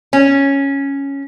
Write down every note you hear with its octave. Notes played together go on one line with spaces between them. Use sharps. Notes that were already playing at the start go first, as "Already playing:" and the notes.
C#4